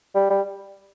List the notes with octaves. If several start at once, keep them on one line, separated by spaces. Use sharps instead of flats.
G3
G3